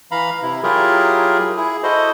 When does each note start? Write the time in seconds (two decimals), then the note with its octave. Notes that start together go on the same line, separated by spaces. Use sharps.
0.11 E3 F5 A#5 B5
0.42 C3 E4
0.63 F#3 E4 F4 G4 G#4 A#4
1.57 E4 G#4
1.83 E4 F#4 A4 C5 D#5